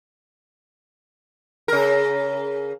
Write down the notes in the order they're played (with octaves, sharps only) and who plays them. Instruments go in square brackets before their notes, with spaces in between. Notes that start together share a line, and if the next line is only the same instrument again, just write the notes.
[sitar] C#3 A#4